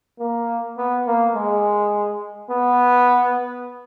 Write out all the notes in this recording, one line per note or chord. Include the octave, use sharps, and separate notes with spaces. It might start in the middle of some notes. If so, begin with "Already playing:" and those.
A#3
B3
A#3
G#3
B3